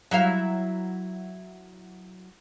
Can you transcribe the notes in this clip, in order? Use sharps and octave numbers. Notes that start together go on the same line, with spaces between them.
F#3 E4 F5